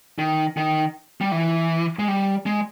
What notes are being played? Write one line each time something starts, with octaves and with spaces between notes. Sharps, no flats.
D#3
D#3
G3
E3
G#3
G3
G#3